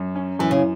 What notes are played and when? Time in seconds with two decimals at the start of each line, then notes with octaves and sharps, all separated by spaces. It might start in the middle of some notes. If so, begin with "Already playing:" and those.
Already playing: F#2
0.15 C#4
0.39 F#2 E3
0.51 C#3